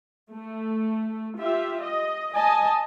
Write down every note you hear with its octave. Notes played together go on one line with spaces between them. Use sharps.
A3
F4 G4 E5
D#5
D#5 G#5 A5